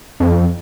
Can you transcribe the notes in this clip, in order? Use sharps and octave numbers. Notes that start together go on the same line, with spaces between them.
F2